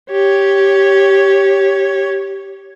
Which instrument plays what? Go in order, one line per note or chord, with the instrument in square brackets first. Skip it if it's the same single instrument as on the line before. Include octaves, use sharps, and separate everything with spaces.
[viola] G4 C#5